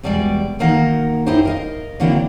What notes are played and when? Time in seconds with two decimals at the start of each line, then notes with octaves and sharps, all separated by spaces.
0.03 E2 B2 G3 G#3 D5
0.59 B2 D#3 A#3 D#4 A#4 F#5
1.26 F#2 D#4 E4 G4 C5
1.45 A#4 D#5 F5
2.00 D3 F#3 A#3 C4 D4 E4